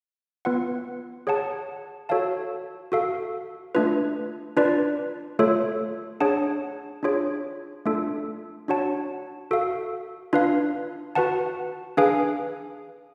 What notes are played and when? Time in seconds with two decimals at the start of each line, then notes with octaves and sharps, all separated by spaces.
0.45 B3 F4 B4 F#5
1.27 G#4 C#5 F#5 A5
2.09 F#4 A4 C#5 F5 A5
2.92 F#4 A4 F5
3.75 A3 D4 F4 B4
4.57 D4 F4 B4 D5
5.39 A3 F4 A4 C#5
6.20 D4 G#4 C#5 F#5 A5
7.03 D4 F4 G#4 C#5
7.86 A3 D4 F4 A4
8.68 D4 F#4 C#5 F#5 A5
9.51 F#4 A4 F5
10.33 D4 F4 B4 F5
11.15 F#4 B4 F#5 A5
11.97 D4 G#4 B4 F5 G#5